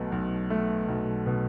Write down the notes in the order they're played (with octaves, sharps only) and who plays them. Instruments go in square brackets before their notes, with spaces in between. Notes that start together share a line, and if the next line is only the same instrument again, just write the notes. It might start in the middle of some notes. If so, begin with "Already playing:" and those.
Already playing: [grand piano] B1 B2 A3
B1
A3
B1
B2